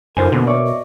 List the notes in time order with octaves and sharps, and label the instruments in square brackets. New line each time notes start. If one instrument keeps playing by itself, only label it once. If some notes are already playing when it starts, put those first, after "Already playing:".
[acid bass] F#2 [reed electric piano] C#3 D#4 A4 [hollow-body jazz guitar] F4 C5 G#5 [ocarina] A#4
[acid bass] B2 [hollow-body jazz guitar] D3 [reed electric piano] A#3 B3 C5
[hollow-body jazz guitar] C#5 D5 [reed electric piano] E5 C#6 D6
[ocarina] D#5